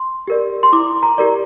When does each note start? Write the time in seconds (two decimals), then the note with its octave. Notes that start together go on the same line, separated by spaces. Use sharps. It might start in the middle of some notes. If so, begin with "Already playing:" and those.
Already playing: C6
0.28 G4 A#4 D5
0.63 C6
0.73 E4 D6
1.03 A#5
1.18 G4 A#4 D5